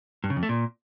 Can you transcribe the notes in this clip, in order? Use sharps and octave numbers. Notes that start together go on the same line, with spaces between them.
G2
C#3
F2
A3
A#2